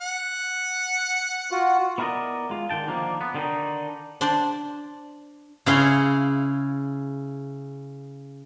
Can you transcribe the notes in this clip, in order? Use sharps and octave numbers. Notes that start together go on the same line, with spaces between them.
F#5
F4 F#4
B3 E4 A#4 B4 D5 D#5
G#3 F4
D3 D#3 G5 A5
D3 D#3 F3 A#3 D4
B3
D3 D#3 A3 C4 D4 D#4
D4 C5 D5
C#3 E4 G#4 C#5 F5 C6